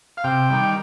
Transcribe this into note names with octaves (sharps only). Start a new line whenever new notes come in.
F5
C3 G5
D#3 G3